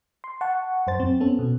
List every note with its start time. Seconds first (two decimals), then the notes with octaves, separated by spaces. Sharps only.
0.24 C6
0.41 F#5 A5 C#6
0.87 F#2 C5 A6
0.99 F#2 C4
1.20 B3 C#4 A4
1.39 B2